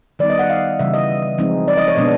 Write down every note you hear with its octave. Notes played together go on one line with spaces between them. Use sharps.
D#3 G3 B3 D#4 D5
D#5
F#5
F5
C#3 E3 G3 E5
D#5
F3 G#3 C4 D#4
D5
D#5
C#5
B2 G#3 B3 D4 D#5